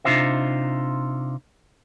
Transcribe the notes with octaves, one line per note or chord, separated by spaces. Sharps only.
C3 D4 D#4 F4 C5 E5